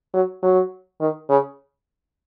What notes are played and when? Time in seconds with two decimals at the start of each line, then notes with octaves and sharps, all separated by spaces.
0.14 F#3
0.43 F#3
1.01 D#3
1.29 C#3